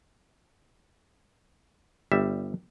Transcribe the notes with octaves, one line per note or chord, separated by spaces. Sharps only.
G1 G3 E5